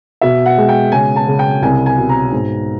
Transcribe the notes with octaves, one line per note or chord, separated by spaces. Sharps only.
B2 E5
F#5
G#3
G5
C#3 G#5
A5
C#3
G5
C2 G#5
G#5
B2
A#5
G#2